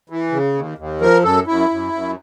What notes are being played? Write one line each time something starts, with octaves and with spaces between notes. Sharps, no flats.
E3
C#3
D#2
D#2
F3 A#4
F#2 A4
F#2 E4
F#2
F#2